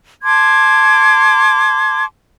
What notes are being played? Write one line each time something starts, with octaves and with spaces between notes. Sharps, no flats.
A5 C6 D6 G#6